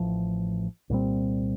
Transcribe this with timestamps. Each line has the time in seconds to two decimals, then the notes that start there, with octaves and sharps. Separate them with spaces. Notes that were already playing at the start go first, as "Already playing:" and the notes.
Already playing: A1 A2 F3
0.90 C2 A#2 G3 C4